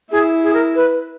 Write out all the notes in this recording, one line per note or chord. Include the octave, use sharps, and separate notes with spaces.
E4 G#4
G#4
A#4
B4